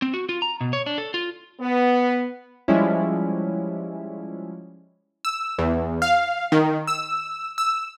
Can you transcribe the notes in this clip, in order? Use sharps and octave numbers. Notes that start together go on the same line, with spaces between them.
C4
F#4
F4
A#5
B2
C#5
D4
A4
F4
B3
F3 G3 G#3 C#4 E4
E6
E2
F5
D#3
E6
E6